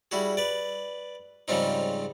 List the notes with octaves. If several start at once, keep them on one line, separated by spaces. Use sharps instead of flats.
G3 E4 F#4 G#4
B4 D5
G#2 C#3 F3 G3 C4 D#4